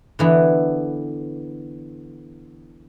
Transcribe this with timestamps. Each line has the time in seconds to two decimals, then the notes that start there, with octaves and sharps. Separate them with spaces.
0.19 D3 E3 B3